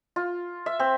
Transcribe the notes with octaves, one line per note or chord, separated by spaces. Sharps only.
F4
E5
C4